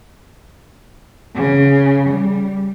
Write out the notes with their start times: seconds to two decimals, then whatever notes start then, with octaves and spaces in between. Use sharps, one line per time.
1.36 C#3
2.10 G3